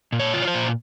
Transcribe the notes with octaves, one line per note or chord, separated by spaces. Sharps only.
A#2
C#5
F4
C#5
C5
A#2